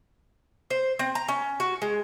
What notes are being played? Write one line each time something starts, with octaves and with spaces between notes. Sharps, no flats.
C5
C4
A#5
C#4
F#4
G#3